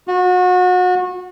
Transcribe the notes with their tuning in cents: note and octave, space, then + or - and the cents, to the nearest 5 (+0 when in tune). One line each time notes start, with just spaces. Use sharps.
F#4 -30